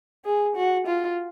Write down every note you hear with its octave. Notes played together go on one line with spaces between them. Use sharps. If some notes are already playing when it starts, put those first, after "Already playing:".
G#4
F#4
F4